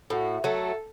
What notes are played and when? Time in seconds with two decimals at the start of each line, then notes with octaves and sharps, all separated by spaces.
0.10 A2 F#4
0.44 F#3 A3 A4